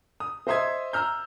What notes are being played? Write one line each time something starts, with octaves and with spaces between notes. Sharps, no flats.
D#6
C5 D#5 E5 C6 D#6 G#6
A#5 E6 F6 G6